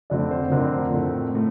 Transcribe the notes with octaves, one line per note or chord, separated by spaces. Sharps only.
F2 D3 A3 C4 D5
C5
F2 D3 A3 C4 A#4
A2 A3 C4
A2 A3